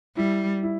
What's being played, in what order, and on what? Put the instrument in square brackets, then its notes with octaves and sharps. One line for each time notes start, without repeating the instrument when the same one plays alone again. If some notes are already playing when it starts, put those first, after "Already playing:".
[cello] G3 [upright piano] E4
[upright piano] E4